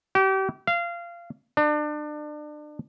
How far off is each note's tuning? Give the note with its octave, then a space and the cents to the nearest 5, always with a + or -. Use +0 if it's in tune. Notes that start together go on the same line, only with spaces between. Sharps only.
G4 -35
F5 -20
D4 +35